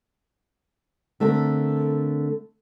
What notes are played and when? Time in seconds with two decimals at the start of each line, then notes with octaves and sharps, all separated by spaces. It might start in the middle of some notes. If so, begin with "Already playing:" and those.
1.20 D3 A3 C4 A#4